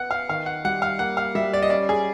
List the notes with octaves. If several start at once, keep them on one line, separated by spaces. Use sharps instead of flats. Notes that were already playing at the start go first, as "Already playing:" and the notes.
Already playing: B3 F#5
F5
D#3 F5
F#5
G3 F#5
F5
A#3 F#5
F5
G3 E5
D5
D#5
C#4 D5
G#4